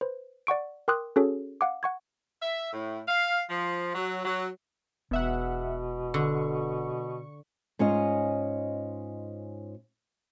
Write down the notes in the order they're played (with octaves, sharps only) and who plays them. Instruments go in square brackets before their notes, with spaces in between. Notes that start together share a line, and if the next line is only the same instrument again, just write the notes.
[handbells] B4 C5
D5 F#5 C#6 D7
A#4 G5 C6 D6 D#6 F#6
C#4 F#4 G#4 A4 C#5
F5 F#5 D6
F#5 C#6 G#6
[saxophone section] E5
A2
F5
F3
F#3
F#3
[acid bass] E1 [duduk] B2 [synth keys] B3 E5 F#5
[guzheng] D3 [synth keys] C#6
[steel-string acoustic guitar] G#2 C#4 F4 D#5